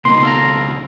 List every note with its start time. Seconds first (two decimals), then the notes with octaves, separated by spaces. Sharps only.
0.05 C#2 B2 A#3 D#4 C6
0.23 A4 F5 A#5